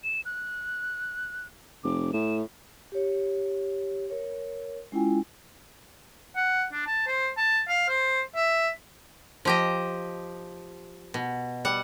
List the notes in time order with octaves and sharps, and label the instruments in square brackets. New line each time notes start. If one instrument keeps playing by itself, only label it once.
[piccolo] E7
F#6
[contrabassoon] F1 [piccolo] D6
[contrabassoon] A2 [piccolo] E7
[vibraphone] G4 C#5
A#4 C#5
G#3 C#4 E4 F4 G5 G#5
[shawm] F#5
D4
A5
C5
A5
F5
C5
E5
[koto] F3 G4 D#5
B2
G3 F#5